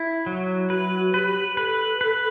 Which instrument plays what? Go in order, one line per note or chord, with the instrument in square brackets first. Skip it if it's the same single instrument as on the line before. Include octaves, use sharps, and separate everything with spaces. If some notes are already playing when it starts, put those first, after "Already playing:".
Already playing: [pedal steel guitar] E4
F#3
[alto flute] F#4 [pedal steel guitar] B4
[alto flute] G4 [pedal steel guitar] B4
[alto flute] A4 [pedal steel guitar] B4
[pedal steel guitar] B4